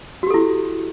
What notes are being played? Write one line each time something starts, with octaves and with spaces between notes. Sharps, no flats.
E4 F#4 G4 A4